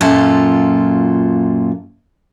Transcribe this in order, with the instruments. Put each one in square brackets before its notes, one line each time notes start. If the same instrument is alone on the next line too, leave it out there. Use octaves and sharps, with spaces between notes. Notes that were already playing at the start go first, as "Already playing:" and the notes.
[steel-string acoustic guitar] F#2 A#2 F4 A4